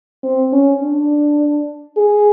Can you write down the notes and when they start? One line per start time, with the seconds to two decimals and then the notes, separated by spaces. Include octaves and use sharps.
0.24 C4
0.53 C#4
0.81 D4
1.97 G#4